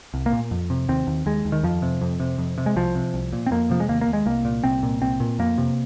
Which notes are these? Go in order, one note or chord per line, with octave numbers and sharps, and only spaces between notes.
C2
A#3
A#2
F2
C3
D#2 C4
D#2
D#2 G#3
D#2
D#3
F2 F3
C3
F2
C3
F2
C3
G#3
C2 F3
C3
C2
A#2
C4
F2 A#3
C3 F3
G#3
D#2 A#3
A#3
D#2
G#3
C2 A#3
A#2
C2 C4
A#2
C2 C4
A#2
F2 A#3
C3